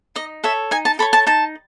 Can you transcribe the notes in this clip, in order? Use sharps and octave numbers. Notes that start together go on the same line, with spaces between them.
D#4 D#5
A4 C#5 E5
D#4 G#5
A5
A4 C#5 B5
A5
D#4 A5